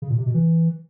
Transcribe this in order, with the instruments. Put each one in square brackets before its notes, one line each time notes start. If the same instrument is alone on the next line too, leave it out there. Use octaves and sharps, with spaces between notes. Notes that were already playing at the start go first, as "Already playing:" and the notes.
[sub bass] C#3
A#2
C3
B2
E3